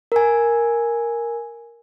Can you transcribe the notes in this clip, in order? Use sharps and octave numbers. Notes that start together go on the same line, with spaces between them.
A#4 G#5